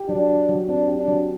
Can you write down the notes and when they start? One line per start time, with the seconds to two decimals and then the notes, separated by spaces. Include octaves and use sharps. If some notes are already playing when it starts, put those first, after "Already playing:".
Already playing: G4
0.09 F#3 D4
0.29 F#3
0.49 F#3
0.68 C4 D4
0.88 G4
0.98 D4
1.08 F#3